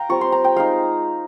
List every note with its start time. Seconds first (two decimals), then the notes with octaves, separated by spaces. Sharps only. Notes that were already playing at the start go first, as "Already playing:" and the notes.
Already playing: F5 G5 A#5
0.09 G3 C4 F4 C#6
0.21 C6
0.32 A#5
0.44 G5
0.56 G#3 D#4 F5